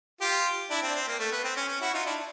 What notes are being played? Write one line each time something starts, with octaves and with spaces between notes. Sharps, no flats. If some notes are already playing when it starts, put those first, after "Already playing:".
F4 G4
D4 E4
C4 D4
C4
A#3
A3
B3
C4
C#4
C#4
E4 F#4
D#4 F4
D4 E4